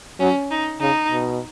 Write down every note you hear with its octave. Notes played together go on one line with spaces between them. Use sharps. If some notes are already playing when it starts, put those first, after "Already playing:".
F#3 C#4
D#4
C#3 D#4
B2